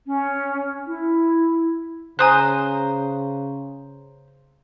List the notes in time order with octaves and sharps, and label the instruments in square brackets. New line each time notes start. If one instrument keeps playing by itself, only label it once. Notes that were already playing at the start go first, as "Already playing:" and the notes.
[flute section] C#4
E4
[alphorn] C#3 [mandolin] C5 A#5 [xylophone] G#5 D#6 F#6